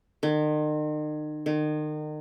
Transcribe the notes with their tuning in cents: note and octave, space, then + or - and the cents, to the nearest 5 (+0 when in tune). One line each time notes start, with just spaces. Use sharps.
D#3 -40
D#3 -35